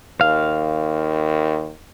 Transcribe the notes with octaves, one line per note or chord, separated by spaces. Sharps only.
D#2 F5